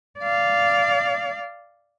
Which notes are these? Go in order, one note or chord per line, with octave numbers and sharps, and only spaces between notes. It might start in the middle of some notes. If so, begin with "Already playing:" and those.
D5 F5